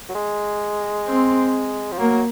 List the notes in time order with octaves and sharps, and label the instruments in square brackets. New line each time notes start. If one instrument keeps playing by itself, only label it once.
[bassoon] F#3
G#3
[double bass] C4
[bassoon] F3
[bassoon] F#3 [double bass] A#3